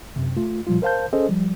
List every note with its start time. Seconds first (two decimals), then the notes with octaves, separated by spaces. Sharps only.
0.16 F#2 C3
0.37 A3 F4
0.67 A#2 F3 G3 F4
0.82 A#4 C5 F5 A5 G6
1.13 C#4 G#4 A4 C5 D#5
1.29 F3 G3